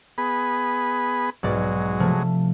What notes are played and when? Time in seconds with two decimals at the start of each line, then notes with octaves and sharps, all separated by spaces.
0.18 B3 G#4 B5
1.43 B1 G#2 F#3 G#3 D5
2.00 C3 F3 A3